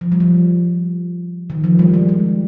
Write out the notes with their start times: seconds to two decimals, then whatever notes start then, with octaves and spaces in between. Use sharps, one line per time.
0.01 F3
0.12 G3
0.20 F3
1.50 D#3
1.64 F3
1.79 G3
1.94 G#3
2.09 G3